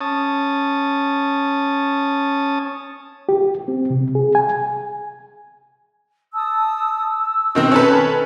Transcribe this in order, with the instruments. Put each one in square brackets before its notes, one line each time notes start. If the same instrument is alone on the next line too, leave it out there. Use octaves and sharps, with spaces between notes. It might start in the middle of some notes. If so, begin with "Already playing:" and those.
[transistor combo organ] C#4 A5 D#6
[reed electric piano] G4
C4
C3
G#4
G#5
[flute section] A5 D#6 E6
E6
[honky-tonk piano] B2 D#3 C4
C#4 A4 B4